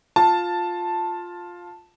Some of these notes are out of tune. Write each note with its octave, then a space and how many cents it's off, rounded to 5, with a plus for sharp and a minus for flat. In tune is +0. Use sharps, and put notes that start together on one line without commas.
F4 +10 A5 +0